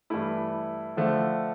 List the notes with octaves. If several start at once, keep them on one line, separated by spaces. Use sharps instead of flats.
G2 E3 A3 E4
D3 F3 A3